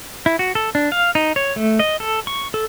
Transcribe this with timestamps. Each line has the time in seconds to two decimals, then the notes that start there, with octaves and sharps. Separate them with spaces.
0.26 E4
0.39 F#4
0.55 A4
0.75 D4
0.92 F5
1.15 D#4
1.36 C#5
1.56 A3
1.79 D#5
2.00 A4
2.27 C#6
2.54 A4